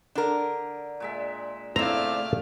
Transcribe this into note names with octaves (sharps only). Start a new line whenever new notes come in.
D3 D4 A#4
A#2 G#3 E5
A#2 C#3 A3 C4 E4 D5 F5 A#5